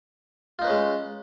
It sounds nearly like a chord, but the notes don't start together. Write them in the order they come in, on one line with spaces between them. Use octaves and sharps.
F4 D#4 B4 C#4 G#3